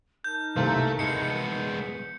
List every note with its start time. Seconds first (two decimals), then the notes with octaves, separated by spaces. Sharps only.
0.24 D#4 A#4 A5 G6
0.56 C2 A3 A#3 C4
0.99 G#3 B3 C#7